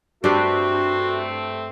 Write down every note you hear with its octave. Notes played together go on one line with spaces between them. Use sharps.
G2 A3 C4 D4 F#4 G4 B4